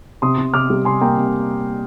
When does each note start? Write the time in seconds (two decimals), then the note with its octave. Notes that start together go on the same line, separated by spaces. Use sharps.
0.22 C3 C6 D#6
0.38 C3
0.54 C3 D6 F6
0.70 G3
0.85 C3 G#5 C6
1.01 A#3 G5 A#5
1.17 C3